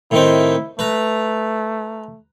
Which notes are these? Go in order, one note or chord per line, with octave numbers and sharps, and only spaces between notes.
A2 D#3 C4 E4
A3 B4 A#5